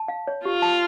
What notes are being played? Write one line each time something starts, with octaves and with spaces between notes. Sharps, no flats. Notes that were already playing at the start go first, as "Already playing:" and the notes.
Already playing: A5
F5
C#5
F4 G4
A5